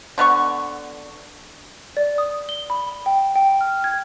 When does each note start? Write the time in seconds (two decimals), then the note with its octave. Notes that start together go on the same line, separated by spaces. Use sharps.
0.18 D3 B3 F#5 C#6
1.97 D5
2.18 D#6
2.49 G7
2.70 B5
3.06 G5
3.36 G5
3.61 F6
3.84 G#6